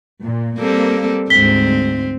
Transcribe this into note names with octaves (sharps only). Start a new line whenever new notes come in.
A#2
G3 A#3 C4 A4
D2 G#2 C4 B6 G7